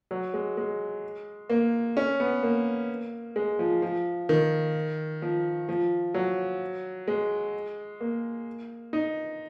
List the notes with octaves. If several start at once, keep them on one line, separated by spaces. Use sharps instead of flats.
F#3
G#3
G#3
A#3
C#4
B3
A#3
G#3
F3
F3
D#3
F3
F3
F#3
G#3
A#3
D#4